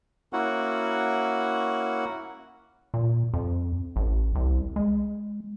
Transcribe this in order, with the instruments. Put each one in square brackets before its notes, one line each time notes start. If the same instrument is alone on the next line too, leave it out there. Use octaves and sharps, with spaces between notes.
[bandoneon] A#3 C#4 E4 F#4 F#5
[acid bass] A#2
F2
A1
C2
G#3